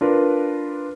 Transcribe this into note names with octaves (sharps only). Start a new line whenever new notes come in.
D4 F4 A#4 B4